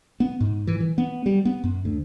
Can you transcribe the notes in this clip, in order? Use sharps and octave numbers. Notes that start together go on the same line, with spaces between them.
B3
G#2
E3
E3
B3
G3
B3
F#2
D2